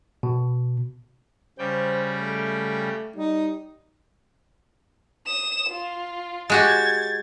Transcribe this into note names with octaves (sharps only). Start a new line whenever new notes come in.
B2
C#3 G3 C5 G5
A3
G3 D#4
D#6 E7
F4
G#3 F#4 G4 G#6 A6